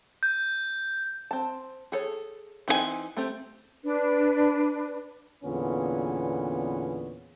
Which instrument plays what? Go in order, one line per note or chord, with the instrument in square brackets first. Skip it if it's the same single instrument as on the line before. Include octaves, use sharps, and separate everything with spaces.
[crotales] G6
[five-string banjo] C4 A5
G#4 A4 C#5
E3 C4 D#4 F4 G#5
A3 C4 G4
[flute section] D4 B4
[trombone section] E2 A#2 D3 B3 C#4